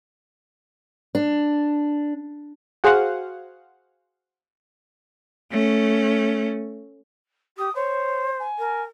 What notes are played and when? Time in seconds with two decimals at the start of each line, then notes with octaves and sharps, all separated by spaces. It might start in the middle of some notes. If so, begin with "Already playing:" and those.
1.15 D4
2.84 F#4 G#4 C5 F5 F#5
5.51 A3 C#4
7.57 G4 D#6
7.75 C5 C#5
8.39 G#5
8.58 A#4